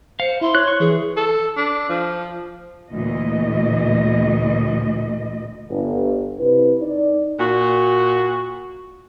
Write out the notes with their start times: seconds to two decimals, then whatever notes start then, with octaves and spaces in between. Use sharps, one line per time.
0.20 C5 F5 C#7
0.41 E4 C6
0.55 C#5 F#6
0.68 C#6
0.80 E3 G#4
1.17 A4
1.57 D4
1.89 F3
2.91 D2 A#2 E3 D#5
5.69 G1
6.40 C3 E4 B4
6.82 D#4 D5
7.39 A#2 F#4